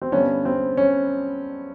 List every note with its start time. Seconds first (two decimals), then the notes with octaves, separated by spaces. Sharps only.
0.02 C4
0.12 G2 D3 G3 B3 C#4
0.45 C4
0.77 C#4